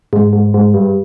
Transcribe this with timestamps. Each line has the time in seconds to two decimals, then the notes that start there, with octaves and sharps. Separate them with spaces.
0.13 G#2
0.33 G#2
0.54 G#2
0.74 G2